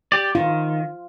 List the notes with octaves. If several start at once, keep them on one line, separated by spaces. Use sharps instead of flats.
G4 D5
D#3 F4